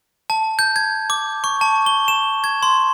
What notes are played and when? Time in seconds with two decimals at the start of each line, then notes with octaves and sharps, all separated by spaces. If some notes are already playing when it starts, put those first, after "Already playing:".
0.30 A5
0.59 G6
0.76 G#6
1.10 D6
1.44 C#6
1.61 A5
1.86 G7
2.08 E7
2.44 G#6
2.63 C6